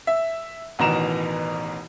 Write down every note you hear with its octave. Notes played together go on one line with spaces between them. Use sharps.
E5
A1 B2 D#3 E3 A#5 E7